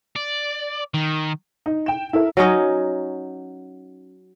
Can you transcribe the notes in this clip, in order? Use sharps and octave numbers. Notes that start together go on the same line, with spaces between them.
D5
D#3
D#4
G5 E7
E4 A4 A#4
F#3 C#4 D#4